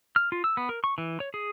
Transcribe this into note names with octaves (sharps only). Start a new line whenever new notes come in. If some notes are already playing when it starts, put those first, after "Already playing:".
F6
F4
E6
B3
A#4
C#6
E3
C#5
G#4